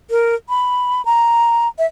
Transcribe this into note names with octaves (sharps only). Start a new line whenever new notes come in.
A#4
B5
A#5
E5